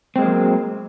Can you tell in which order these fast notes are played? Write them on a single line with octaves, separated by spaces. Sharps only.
C4 G#3 A#3 F#3